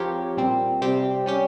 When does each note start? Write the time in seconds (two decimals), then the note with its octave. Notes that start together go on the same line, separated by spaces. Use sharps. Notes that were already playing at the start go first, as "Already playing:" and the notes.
Already playing: F3 C4 G4 A#4 C#5
0.37 A#2 G3 C4
0.82 C3 G3 C4 G4
1.26 G3 C#4 G4